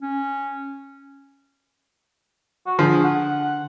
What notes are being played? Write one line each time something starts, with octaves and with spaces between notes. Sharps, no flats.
C#4
F#4
D3 F3 G#4
F#5